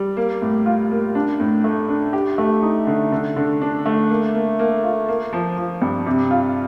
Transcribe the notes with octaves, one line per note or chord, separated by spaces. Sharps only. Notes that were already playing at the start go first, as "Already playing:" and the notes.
Already playing: G3
A#3
A2
F4
A#3
D4
A2
A3
D4
G4
A3
D#4
D3
D3
D3
D4
A3
A#3
A#3
A#3
F4
A#3
F3
F3
G2
C3
F4